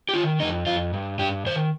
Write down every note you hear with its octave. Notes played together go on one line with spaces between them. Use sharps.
G4
D#3 F4
F2 D#4
F2 F4
G2
G2 G4
D#3 C5